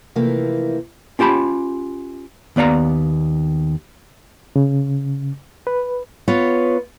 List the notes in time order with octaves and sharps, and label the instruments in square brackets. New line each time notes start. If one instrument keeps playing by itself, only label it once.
[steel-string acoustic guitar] C3 E3 F3 A3 A#3
[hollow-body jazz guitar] C#4 F4 G4 A5 B5
D#2 B3 D5 F5 A#5
[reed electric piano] C#3
B4
[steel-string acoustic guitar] B3 F4 B4 C#5